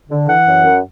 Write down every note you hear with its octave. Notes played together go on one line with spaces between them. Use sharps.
D3
E3 F#5
F#2
F#2